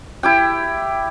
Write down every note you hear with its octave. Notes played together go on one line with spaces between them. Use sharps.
E4 G4 G5